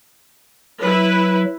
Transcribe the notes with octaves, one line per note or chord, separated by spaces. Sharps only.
F#3 E4 B4